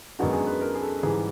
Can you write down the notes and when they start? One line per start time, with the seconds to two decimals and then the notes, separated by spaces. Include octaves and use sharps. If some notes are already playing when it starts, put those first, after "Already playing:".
0.19 F#2 D#3 G#3 B3 D4 F#4
0.33 G#4
0.47 B4
0.61 A#4
0.75 G#4
0.82 A4
1.03 G#2 E3 G3 G#4